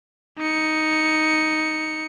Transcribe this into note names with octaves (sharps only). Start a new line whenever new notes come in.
D#4 C#7